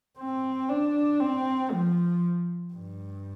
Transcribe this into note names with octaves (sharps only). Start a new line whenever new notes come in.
C4
D4
C4
F3
G2